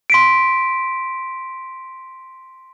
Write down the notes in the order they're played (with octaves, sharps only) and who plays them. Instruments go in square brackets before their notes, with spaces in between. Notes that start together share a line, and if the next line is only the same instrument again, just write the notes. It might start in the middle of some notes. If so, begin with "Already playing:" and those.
[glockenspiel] C6 B6 D7